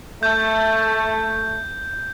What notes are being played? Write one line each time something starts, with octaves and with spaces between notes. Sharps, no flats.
A3 G6